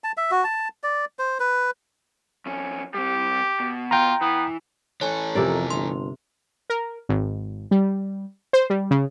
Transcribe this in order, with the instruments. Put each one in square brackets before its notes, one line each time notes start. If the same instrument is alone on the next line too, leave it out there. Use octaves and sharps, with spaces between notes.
[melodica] A5
E5
F#4
A5
D5
C5
B4
[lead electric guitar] F2 C#4
[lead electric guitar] G3 C4 [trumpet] G4
[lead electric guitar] B2
[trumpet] F4 [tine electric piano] G5 A#5
[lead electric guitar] E3 [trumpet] B3
[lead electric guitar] E3 A4 [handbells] C#5 G#5
[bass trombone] F2 [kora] C3 A#4 D5
[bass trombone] G1 [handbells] C6
[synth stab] A#4
G#1
G3
C5
G3
C#3